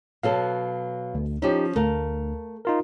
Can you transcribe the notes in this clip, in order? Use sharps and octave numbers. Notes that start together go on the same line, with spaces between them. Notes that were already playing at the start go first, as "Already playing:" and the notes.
B2 F#3 A4 F5
D2
F3 C#4 D#4 G4
D2 A3 A#4 F5
D#4 F4 A#4